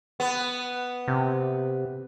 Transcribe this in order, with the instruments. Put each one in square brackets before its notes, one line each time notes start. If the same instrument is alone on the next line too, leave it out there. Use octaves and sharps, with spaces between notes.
[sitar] B3
[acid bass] C3